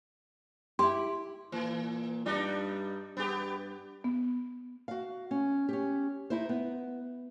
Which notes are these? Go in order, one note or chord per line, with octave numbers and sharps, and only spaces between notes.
E4 G4 C6
A#2 E3
G2 G3 D4 D#4
G2 B3 G4
B3
F#4 F5
C#4
C#4 G4
D#4 E4 C5
B3